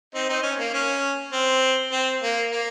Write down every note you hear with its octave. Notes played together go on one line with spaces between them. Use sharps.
C4 D#4
C4 D#4
C#4
A#3
C#4
C4
C4
A#3
A#3